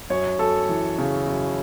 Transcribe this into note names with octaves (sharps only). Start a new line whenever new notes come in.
F#2 C#5
F#2 A4
E3
C#3
F#2